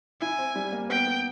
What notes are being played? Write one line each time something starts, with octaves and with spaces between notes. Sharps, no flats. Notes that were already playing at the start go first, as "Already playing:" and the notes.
E4 G#5
C4
G3
A#3
B3 G5
B3